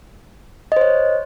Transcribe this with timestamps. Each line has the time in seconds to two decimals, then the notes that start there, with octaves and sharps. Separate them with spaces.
0.72 D#5
0.77 C5
0.81 C#5